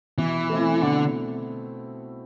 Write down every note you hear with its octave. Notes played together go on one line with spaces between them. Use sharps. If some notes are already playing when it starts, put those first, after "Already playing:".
B2 E3
A3 C4 E4
B2 D3